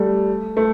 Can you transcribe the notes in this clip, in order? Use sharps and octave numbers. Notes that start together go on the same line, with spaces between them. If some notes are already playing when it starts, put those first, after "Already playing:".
Already playing: G3 A3
A3